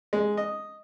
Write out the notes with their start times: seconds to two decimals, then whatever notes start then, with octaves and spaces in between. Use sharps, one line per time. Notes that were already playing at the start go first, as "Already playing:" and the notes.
0.13 G#3
0.37 D#5